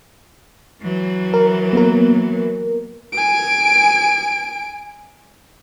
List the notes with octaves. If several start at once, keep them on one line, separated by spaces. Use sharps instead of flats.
E3 F#3
A#4
A#3 B3 A#4
G#5 D7